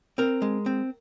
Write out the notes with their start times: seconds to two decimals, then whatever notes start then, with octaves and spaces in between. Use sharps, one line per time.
0.18 C4 A#4
0.42 G#3
0.66 C4